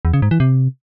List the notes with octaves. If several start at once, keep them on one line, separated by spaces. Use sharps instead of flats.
E2
C#3
G#2
E3
C3